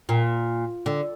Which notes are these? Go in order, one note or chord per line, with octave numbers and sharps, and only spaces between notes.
A#2
D3